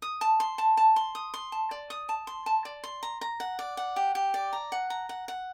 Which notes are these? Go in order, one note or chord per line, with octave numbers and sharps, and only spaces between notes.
D#6
A5
C6
A5
A5
C6
D#6
C6
A5
D5
D#6
A5
C6
A5
D5
C6
A#5
A#5
F#5
D5
F#5
G4
G4
D5
A#5
F#5
A#5
F#5
F#5